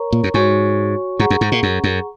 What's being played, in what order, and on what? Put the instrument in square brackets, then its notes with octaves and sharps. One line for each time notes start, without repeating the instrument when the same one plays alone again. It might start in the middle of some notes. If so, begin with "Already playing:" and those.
Already playing: [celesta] A#4 C#5 A#5 C#6
[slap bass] A#2
F#2
[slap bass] G#2 [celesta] F#4 C#5 G#5 C#6
[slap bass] G#2 [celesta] G#4 F#5 A#5 C#6
[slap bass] F#2
G#2
A#2
F#2
F#2